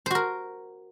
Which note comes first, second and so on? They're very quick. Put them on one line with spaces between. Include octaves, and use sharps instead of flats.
C5 F#4 A#4